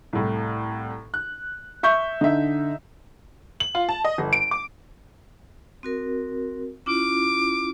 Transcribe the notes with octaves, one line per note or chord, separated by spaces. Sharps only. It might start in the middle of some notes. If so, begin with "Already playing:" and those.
C2 A2
F#6
E5 C#6 G6
D3 D#4 E5
F#7
F4
A5
D#5
G1
D7
D6
C4 F#4 A#4
C#4 E4 F4 D6